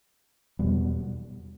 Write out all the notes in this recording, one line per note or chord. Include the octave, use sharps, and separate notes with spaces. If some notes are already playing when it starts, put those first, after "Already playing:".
E2 B2 G3 B3